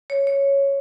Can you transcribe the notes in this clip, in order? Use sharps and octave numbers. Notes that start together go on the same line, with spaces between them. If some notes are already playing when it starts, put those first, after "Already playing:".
C#5
C#5